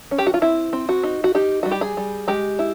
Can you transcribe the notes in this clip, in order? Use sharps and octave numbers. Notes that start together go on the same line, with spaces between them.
C#4
G4
F#4
F4
C4 E4
C4
F#4
D#4
F#4
D#4 G4
G3 F#4
G4
G#4
G3
G#3 G4
E4